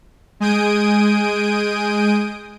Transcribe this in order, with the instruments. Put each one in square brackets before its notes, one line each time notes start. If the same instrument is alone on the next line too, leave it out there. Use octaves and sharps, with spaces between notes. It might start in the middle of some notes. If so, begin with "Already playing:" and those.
[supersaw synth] G#3 G#5 D#6 G6 D7 D#7